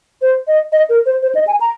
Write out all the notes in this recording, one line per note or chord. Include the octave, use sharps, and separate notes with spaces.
C5
D#5
D#5
A#4
C5
C5
D#5
G#5
A#5